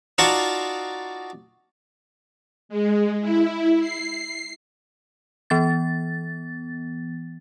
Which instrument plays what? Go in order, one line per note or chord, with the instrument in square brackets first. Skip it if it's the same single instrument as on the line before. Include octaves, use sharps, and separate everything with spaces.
[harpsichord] D#4 F4 F#4 D5 A5 C#6
[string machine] G#3
E4
C7
[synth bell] E3 B3 A6